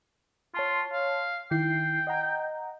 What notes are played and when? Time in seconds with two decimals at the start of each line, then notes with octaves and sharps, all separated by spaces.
0.54 F4 C#5 A5 C6
0.93 F5
1.51 D#3 E4 G5 C7
2.07 D#5 F#5 A#5